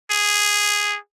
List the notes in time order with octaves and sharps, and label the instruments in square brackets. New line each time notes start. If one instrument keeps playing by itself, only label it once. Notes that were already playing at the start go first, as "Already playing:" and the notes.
[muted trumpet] G#4